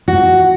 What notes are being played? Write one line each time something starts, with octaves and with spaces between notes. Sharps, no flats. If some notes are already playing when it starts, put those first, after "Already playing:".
F#4